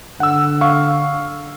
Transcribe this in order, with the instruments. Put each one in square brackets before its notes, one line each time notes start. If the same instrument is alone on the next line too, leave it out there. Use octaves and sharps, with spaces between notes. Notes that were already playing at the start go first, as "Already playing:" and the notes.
[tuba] D3 [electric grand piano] F#5 E6
[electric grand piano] F5 C#6